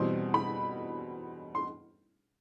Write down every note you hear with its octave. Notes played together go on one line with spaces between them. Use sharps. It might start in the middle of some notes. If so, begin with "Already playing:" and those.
Already playing: E2 B2 G3 C4 C6
B5
C6